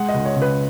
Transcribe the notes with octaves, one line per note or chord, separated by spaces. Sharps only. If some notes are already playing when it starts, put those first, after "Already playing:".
Already playing: G#3 F#5
D#5
C#2
C#5
C#3
B4